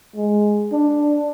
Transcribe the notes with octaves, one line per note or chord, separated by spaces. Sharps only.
G#3
D4